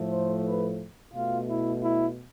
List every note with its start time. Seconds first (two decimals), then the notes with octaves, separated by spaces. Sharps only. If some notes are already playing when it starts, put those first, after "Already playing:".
Already playing: A2 F3 A3
0.10 C5
0.44 B4
1.13 B2 A3 F4
1.47 E4
1.82 E4